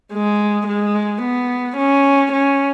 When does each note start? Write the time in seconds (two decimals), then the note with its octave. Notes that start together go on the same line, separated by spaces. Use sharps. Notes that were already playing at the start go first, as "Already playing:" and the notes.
0.13 G#3
0.68 G#3
1.22 B3
1.78 C#4
2.33 C#4